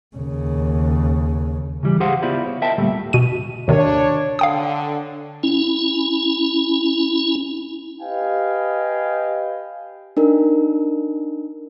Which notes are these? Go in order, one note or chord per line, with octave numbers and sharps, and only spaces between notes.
D#2 C#3
C#3 E3 G3
G4 G#4 C5 F5 F#5
B3 E4 F4 C5 D5 F5
C#5
A#4 C5 D#5 E5 G5 A5
D2 A#2 G3 A3
B2 D#7
D#2 C3 D#3 D4 C#5
D3 F5 G5 D#6
C#4 E4
G4 B4 D#5 F5 G5 G#5
D4 D#4 A#4